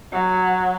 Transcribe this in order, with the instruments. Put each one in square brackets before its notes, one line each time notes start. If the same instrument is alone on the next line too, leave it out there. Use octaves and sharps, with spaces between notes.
[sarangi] F#3